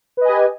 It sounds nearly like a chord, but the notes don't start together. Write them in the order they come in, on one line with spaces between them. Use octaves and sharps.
B4 D#5 G#5 G4